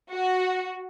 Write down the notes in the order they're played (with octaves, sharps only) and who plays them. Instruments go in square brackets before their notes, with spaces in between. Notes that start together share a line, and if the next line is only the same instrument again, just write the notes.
[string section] F#4